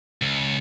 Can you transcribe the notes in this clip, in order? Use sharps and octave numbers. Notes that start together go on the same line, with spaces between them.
C#2